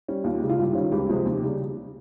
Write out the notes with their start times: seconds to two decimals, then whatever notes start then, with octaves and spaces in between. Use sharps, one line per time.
0.08 G3 C#4
0.24 D#2 F4
0.37 C#3 G#3 G4
0.49 F4
0.58 G2 G4
0.73 D#3 G3 C#4 F4
0.92 C#2 G4
1.09 C3 F3 G#3
1.25 D#2
1.43 C#3 G3